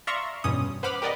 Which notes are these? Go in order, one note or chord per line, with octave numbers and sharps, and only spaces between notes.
D5 E5 F5 A#5 C6 C#6
E2 G2 B2 G3 C#4 D#6
B4 C5 F#5 B5 D6 F6
G4 A#4 B4 D5 D#5 F#5